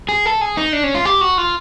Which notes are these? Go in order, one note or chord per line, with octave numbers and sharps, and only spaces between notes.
G#4
A4
G#4
D#4
D4
C#4
F4
G4
F#4
F4